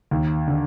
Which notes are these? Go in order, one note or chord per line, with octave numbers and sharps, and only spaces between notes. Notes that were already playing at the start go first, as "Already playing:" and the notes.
D#2
D3